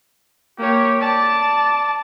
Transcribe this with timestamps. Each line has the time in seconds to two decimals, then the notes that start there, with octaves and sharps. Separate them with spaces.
0.58 A#3 G4 C#5
1.00 D5 A5